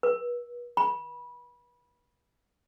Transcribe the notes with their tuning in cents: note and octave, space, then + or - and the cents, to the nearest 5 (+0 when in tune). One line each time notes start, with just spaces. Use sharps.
B4 -40
B5 -20